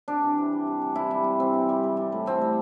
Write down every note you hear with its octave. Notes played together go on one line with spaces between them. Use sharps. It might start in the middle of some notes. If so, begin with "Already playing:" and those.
C3 D4
E3
C3
G3
C3
E3
C3 E4
G3
C3
E3 C4
C3
G3
G3
G3
A2
A2 C4
G3